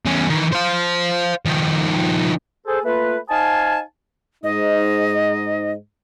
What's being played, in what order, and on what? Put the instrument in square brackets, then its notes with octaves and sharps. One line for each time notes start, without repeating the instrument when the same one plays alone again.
[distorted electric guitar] E2 C#4
D#3 E3
C5 F5
D#3 F3
[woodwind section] G#4 A4 C5
A3 A#3 F4 B4
D#4 C5 F5 G#5 A5
[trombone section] G#2 D#4 [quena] D#5